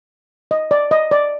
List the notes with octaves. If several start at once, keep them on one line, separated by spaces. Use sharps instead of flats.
D#5
D5
D#5
D5